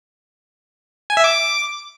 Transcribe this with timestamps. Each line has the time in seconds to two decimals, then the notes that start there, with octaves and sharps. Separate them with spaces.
1.10 G#5
1.17 E5
1.24 D6